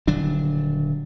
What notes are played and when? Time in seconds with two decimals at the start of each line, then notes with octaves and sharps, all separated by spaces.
0.07 D#1 D3 F#3 D4